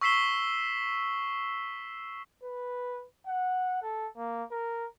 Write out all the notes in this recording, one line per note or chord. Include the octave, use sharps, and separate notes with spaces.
C#6 E6 B6 C7 E7 G7
B4
F#5
A4
A#3
A#4